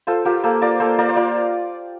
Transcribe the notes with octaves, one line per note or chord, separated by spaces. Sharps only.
F4 A4 C5
F4 G4 A#4
A#3 A4 C5
F4 A#4 D5
A#3 A4 C5
A#3 A#4 D5
C5
F4 A#4 D5